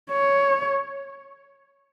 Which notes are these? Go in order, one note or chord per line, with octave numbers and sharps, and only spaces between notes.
C#5